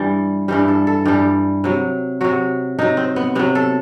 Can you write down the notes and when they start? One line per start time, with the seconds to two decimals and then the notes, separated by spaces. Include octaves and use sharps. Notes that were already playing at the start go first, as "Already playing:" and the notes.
Already playing: G2 E3 G3
0.48 G2 E3 G3 G4
0.68 A4
0.87 A4
1.05 G2 E3 G3 G4
1.64 C3 F#3
2.21 C3 F#3 F#4
2.78 C3 F#3 D#4
2.97 C4
3.16 B3
3.35 C3 F#3 B3
3.55 A4